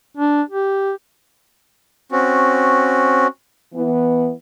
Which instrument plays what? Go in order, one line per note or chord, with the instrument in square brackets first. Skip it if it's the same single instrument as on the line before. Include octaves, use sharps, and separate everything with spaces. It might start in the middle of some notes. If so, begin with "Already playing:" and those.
[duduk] D4
G4
[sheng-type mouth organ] C4 C#4 F#4
[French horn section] E3 B3